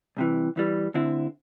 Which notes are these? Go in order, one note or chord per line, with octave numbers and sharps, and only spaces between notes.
C2 C3 E3
E2 E3 G3
D2 D3 C4 E4